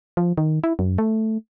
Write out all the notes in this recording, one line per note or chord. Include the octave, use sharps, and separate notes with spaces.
F3
D#3
E4
F#2
A3